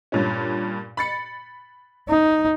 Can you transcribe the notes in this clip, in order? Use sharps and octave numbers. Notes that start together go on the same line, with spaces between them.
G2 A#2 C#4
B5 A6 C#7
D#4